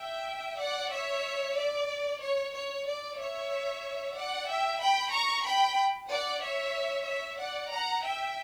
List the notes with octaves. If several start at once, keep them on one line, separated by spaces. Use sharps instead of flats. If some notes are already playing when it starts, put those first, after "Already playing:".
Already playing: E5 G5
D5 F#5
C#5 E5
D5
C#5
C#5
D5
C#5 E5
D5 F#5
E5 G5
G5 B5
A#5 C#6
G5 B5
D5 F#5
C#5 E5
C#5 E5
D5 F#5
F#5 A#5
E5 G5